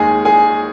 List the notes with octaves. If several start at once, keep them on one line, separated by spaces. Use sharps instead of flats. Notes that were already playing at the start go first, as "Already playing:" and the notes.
Already playing: D#2 D#3 G#3 G#4 G#5
G#4 G#5